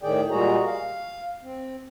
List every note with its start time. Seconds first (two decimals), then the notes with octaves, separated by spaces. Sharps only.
0.03 A2 D#3 G#4 D5 G5
0.31 A#2 G3 G#3 F#4 G#4 A#5
0.67 F5
1.43 C4